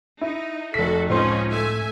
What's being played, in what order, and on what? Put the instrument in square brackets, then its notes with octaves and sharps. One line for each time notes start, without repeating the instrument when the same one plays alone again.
[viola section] D#4 [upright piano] E4
[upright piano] F1 B6 [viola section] F#4 A4
[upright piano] C#2 C4 C6 [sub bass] A2 [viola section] F3 C#4 D#4
[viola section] A3 E5 G#5